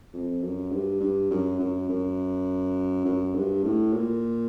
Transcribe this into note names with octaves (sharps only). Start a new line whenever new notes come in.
F2
F#2
G2
G2
F#2
F#2
F#2
F#2
G2
A2
A#2